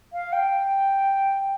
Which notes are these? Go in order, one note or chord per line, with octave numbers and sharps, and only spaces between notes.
F5
G5